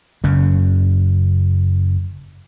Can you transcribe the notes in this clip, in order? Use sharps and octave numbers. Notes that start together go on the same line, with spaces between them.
F#1 F#2 C#3